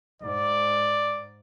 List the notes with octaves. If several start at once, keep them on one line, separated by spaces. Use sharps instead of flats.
G#2 D5